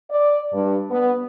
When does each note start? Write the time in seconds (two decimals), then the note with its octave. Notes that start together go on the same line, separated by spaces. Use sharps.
0.10 D5
0.53 G2
0.91 B3